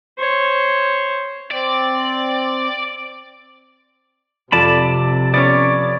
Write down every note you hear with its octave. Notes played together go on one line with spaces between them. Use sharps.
C5 C#5
C4 D5
F2 C3 D5 A5 B5
B3 C#4 C#5 D5